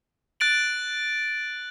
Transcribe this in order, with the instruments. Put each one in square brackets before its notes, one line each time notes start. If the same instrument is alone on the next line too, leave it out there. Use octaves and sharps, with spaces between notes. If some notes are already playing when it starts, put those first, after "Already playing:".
[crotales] F#6 A6 D7 F#7